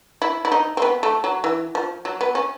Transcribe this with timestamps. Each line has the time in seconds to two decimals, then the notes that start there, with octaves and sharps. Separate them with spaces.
0.22 E4
0.45 E4
0.52 D#4
0.77 C4
0.82 B3
1.03 A3
1.24 F#3
1.44 E3
1.75 F3
2.05 F#3
2.21 B3
2.35 C#4